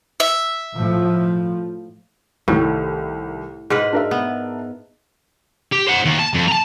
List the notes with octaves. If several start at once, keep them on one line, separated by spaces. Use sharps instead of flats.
E5
A2 F3
C2 A2 D#3
G#2 G#3 B4 F6
D4 A#4 E5
B3
G4
C5 F#5
D#2
A5
F2
A5 A#5